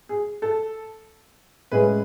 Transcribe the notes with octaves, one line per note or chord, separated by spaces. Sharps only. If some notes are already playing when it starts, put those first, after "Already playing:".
G#4
A4
A2 G#3 C#4 G#4 B4